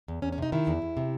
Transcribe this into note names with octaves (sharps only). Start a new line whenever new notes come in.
E2
E2 C#4
C#4
C3 D#4
D#3 E4
E2
E2
C3